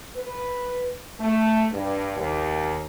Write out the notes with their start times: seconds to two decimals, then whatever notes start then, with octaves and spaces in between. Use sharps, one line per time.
0.16 B4
1.20 A3
1.71 G2
2.16 D#2